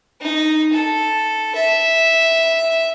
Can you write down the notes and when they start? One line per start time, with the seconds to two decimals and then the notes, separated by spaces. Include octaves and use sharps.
0.21 D#4
0.73 A4
1.55 E5